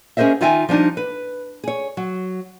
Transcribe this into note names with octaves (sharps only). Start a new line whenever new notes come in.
C#4 G#4 A#4 C5 D#5 E5
D#3 D#4 F4 E5 G5 G#5
F3 G3 D4 D#4
B4
G#4 C#5
F#3